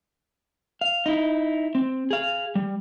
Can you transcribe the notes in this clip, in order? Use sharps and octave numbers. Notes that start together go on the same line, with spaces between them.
F5
D#4 E4
C4
G#4 F5
G3